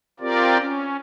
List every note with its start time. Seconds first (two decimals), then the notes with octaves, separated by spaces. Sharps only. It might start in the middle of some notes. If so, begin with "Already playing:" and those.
0.20 C4 F4 G4 A#4 D5
0.59 C#4